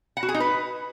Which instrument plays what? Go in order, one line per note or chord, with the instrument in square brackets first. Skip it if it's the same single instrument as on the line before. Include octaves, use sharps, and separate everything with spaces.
[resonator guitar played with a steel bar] F#5
F#4
G#4
D#4
B4